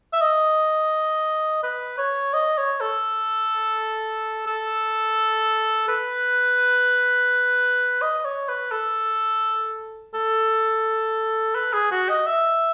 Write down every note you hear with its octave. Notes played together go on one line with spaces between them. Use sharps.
E5
D#5
B4
C#5
D#5
C#5
A4
A4
B4
D#5
C#5
B4
A4
A4
B4
G#4
F#4
D#5
E5